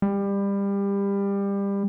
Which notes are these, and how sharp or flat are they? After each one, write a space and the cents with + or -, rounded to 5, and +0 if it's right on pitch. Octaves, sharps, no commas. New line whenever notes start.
G3 +25